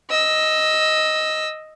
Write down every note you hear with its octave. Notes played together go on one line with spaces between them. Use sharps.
D#5 E6